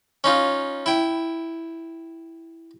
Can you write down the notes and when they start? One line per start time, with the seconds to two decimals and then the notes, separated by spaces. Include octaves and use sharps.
0.24 C#4 D#4 F4
0.86 E4 G5